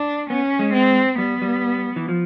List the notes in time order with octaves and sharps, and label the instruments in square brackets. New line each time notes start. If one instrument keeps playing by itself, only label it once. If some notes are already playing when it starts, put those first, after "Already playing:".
Already playing: [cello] D4
[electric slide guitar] B3 [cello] C#4
[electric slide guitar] G#3
[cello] C4
[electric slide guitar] G3 [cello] B3
[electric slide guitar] G3
E3
F3